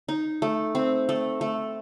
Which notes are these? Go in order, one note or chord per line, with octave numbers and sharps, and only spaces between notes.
D#4
A3
C4
A3
A3